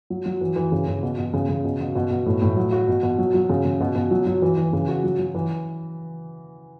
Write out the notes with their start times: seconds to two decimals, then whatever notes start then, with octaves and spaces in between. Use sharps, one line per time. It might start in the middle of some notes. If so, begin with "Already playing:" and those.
0.10 F#3
0.26 F#3
0.41 E3
0.56 E3
0.72 C#3
0.88 C#3
1.03 B2
1.18 B2
1.33 C#3
1.49 C#3
1.64 B2
1.80 B2
1.95 B2
2.11 B2
2.26 A2
2.42 A2
2.57 F#3
2.72 F#4
2.88 B2
3.03 B2
3.18 F#3
3.34 F#3
3.49 C#3
3.65 C#3
3.80 B2
3.95 B2
4.11 F#3
4.26 F#3
4.42 E3
4.57 E3
4.73 C#3
4.88 F#4
5.03 F#3
5.19 F#3
5.35 E3